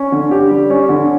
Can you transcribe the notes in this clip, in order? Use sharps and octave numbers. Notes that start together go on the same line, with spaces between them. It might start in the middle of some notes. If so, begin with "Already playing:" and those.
Already playing: C#4
D3
G4
G3
C#4
D3